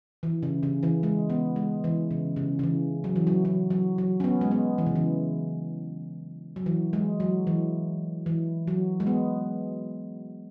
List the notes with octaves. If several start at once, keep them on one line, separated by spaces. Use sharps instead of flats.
E3
C#3
C#3
E3
G#3
B3
G#3
E3
C#3
C#3
C#3
E3
F#3
E3
F#3
F#3
F#3
F#3
C#4
B3
G#3
B3
E3
C#3
E3
F#3
E3
G#3
F#3
E3
E3
F#3
G#3
B3